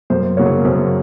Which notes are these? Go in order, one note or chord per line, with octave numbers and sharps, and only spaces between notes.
F#2 C5
C#3 F#3 A#3 C#5
F#2 C5